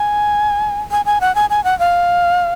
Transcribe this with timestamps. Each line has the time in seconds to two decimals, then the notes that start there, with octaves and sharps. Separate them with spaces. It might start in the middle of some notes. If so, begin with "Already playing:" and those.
Already playing: G#5
0.91 G#5
1.06 G#5
1.21 F#5
1.35 G#5
1.50 G#5
1.64 F#5
1.79 F5